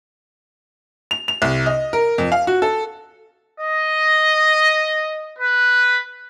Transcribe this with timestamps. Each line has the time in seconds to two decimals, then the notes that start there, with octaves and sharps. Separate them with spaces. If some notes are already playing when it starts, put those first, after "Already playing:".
1.11 F7
1.28 F7
1.42 C2
1.66 D#5
1.93 A#4
2.18 F2
2.32 F5
2.47 F#4
2.62 A4
3.60 D#5
5.38 B4